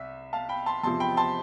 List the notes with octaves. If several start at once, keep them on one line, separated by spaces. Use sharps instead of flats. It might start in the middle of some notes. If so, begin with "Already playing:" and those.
Already playing: C2 E5
F5 A5
G5 B5
A5 C6
E2 C3 F3 A5 C6
G5 B5
A5 C6